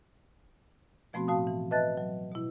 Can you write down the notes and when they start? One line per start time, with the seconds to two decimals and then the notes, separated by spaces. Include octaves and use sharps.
1.13 B2 F3 A3 B3 C4 F#4
1.28 A2 F#4 F5 A5 D#6
1.47 E3
1.71 B4 D#5 E5 A5 F#6 A6
1.97 F#3
2.32 B2 E4